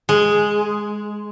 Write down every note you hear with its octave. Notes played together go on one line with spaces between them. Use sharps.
G#3